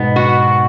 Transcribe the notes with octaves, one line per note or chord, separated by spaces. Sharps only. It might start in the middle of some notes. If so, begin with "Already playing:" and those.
Already playing: G#2 B2 B3
F#4